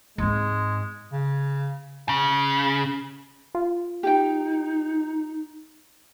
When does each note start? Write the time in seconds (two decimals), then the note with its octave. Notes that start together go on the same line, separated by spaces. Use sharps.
0.18 G#2 G#3 C4
1.13 C#3
2.09 C#3
3.55 F4
4.03 D#4 G4 G5